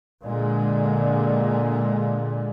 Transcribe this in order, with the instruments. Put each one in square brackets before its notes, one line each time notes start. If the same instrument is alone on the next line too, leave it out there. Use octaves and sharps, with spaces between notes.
[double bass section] A#2 D3 G#3